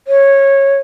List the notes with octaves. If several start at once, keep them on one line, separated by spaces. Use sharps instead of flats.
C#5